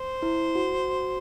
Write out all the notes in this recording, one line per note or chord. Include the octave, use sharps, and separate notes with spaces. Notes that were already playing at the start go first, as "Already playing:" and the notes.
Already playing: C5
E4
F#4